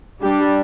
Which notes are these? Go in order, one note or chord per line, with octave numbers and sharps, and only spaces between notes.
G3 D4 G4